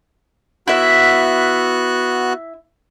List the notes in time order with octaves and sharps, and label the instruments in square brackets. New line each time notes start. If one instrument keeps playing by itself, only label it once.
[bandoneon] B3 F#4 F#6 [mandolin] E4 E5